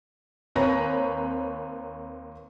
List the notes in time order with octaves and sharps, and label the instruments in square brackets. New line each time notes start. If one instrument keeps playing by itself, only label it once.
[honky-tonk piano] D#2 C4 B4 C#5 A#5 A#6